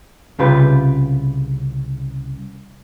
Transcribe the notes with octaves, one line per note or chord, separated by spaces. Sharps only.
C2 C#3 F4 G4 B4